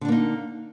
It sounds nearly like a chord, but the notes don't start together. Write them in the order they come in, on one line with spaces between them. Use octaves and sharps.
D3 D4 A#3 D#4